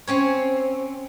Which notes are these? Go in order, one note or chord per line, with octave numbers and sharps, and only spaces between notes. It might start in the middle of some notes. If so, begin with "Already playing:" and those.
C4 C#4 C#5